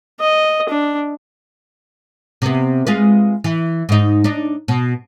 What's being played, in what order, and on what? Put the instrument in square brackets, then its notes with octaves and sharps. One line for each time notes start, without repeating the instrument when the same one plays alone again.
[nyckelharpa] D#5
D4
[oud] C3 B3
G#3 F4 B4
E3
G#2 D#4
D4 D#4
B2